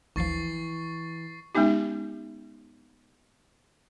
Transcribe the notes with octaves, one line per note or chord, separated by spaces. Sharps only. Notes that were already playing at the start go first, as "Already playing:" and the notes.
G#1 D2 E3 F3 C#6 A6 C7
G#3 B3 C#4 D#4 G4